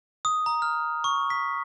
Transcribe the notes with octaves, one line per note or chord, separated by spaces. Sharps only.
D#6
A#5
F6
C#6
B6